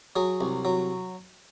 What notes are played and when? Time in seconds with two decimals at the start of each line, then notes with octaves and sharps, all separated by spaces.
0.16 F#3 G#4
0.41 C2
0.65 F#3